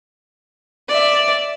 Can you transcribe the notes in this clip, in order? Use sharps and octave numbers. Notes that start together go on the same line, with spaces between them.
D5 E5